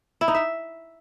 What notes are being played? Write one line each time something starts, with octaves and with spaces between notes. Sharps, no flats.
E4
D#4
E5